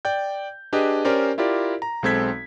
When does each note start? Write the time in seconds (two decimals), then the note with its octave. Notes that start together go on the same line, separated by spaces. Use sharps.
0.05 D5 G5 G6
0.73 D4 G4 G#4 B4 D#5
1.05 C#4 G4 A#4 C5 D5
1.38 E4 F4 G4 A#4 D5
1.82 A#5
2.03 B1 G#3 C4 A4 G#6 B6